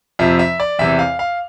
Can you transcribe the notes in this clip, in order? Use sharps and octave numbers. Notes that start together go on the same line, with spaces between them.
F2 C3 F3 E5
E5
D5
E2 C3 E3 E5
F5
F5